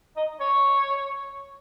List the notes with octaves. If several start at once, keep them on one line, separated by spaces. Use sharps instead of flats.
D#5
C#5